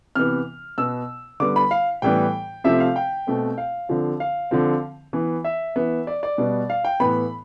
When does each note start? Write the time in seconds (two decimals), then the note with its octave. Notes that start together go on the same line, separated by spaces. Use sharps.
0.15 C3 E3 B3 F6
0.78 B2 B3 E6
1.40 D3 G3 B3 D6
1.56 B5
1.71 F5
2.02 A2 E3 G3 B3 G5
2.64 C3 F3 A3 C4 E5
2.80 F5
2.96 G5
3.27 B2 A3 C4
3.58 F5
3.89 D3 F3 C4
4.20 F5
4.51 D3 F3 C4
5.13 E3 B3
5.45 E5
5.76 E3 B3
6.07 D5
6.23 D5
6.38 B2 G3 B3
6.70 F5
6.85 G5
7.00 A2 E3 B3 B5